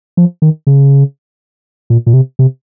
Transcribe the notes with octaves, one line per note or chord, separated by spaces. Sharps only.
F3
D#3
C#3
A#2
A#2
C3
C3